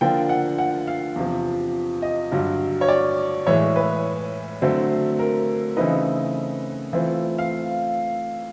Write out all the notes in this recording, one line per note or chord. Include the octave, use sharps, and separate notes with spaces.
D3 F3 A#3 D4 F4 G5
F#5
F#5
F5
E2 C3 F3
D#5
G2 D3 F#3
C#5
D5
A2 E3 G#3 C#5
B4
D3 F#3 A3 C4
A#4
C#3 E3 A3 C4 D#4 B4
E3 A3 C4 F4
F5